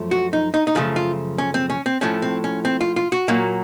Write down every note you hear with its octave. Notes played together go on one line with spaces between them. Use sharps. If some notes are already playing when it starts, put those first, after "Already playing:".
Already playing: F#2 F3 A3
F#4
D#4
D#4
D#4
F#2 C#3 F3 A3 F4
F4
C#4
C4
C#4
C4
A2 F3 A3 C#4
C4
C#4
C4
F4
F4
F#4
A#2 F#3 A#3